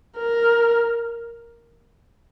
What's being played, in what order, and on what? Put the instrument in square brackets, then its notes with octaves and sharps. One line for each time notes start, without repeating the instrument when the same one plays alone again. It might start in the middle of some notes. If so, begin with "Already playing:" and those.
[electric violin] A#4